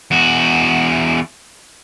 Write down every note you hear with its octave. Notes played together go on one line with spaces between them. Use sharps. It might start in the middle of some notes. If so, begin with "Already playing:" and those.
E2 F#4